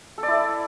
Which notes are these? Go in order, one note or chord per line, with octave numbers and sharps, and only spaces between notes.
A4
D5
E4